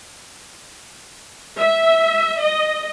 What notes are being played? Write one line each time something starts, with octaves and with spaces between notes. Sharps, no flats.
E5
D#5